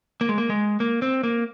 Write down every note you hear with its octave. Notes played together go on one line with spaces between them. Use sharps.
A#3
G#3
A#3
G#3
A#3
C4
A#3